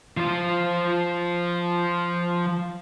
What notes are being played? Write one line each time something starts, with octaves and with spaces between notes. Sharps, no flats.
F3 F4